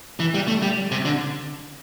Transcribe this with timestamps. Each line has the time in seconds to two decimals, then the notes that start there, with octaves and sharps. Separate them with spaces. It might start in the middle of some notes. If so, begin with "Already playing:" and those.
0.20 E3
0.34 G3
0.48 A3
0.63 G3
0.91 C3
1.05 D3